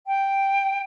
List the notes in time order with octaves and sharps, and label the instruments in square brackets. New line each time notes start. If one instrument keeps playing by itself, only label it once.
[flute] G5